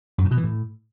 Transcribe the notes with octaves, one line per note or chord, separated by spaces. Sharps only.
F#2
A2
B2
E3
A2